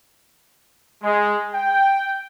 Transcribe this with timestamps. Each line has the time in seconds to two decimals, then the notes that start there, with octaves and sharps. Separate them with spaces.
1.03 G#3
1.55 G5